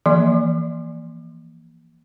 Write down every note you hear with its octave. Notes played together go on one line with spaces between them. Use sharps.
E3 F3 A#3 D5 C6